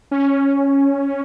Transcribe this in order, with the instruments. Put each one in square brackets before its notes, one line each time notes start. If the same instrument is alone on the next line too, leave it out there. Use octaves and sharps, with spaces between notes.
[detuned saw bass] C#4